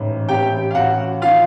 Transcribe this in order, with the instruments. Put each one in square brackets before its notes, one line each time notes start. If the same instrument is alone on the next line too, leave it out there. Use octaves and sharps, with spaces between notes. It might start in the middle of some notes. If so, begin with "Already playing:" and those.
Already playing: [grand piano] A1 G#2
A1 G4 G5
F5
A1 F#4 F#5
D#3 F4 F5